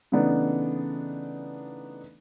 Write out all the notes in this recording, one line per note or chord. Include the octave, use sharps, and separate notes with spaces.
C#3 E3 A3 B3 D4 D#4